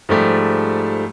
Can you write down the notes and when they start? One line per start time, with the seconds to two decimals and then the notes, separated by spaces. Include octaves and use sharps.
0.09 G#2 F3 G3 A3 G4